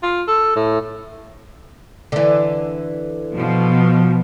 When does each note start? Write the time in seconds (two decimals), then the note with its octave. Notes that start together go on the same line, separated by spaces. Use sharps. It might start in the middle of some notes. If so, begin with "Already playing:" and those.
0.03 F4
0.28 A4
0.56 A2
2.12 D3 E3
3.34 B2 F3